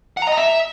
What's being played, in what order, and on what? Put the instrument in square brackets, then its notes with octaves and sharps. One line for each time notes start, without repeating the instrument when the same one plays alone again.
[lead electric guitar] F#5
A#5
D#5
A#5
E5